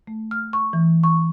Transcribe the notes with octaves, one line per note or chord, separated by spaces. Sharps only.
A3
F6
C#6
E3
C#6